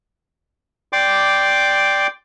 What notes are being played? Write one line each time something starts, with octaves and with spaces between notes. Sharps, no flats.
D5 G5 C6 D6